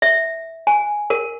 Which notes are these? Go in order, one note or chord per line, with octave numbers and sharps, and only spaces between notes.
E5
G#5
A#4